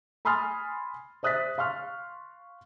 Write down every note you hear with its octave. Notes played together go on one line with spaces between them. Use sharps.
G#5 B5 C6 D#6 F6 A6
C5 E5 D#6 F#6 A6 B6
F5 C6 C#6 F6